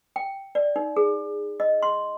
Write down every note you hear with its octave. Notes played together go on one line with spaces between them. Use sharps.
G5
D5
D#4
G#4
D#5
C6